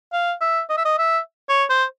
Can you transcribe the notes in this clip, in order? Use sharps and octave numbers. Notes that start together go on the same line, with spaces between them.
F5
E5
D#5
E5
D#5
E5
C#5
C5